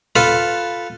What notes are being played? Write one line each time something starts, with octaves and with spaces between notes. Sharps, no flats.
F4 A4 B4